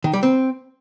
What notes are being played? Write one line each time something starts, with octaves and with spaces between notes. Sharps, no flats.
D#3
G3
C4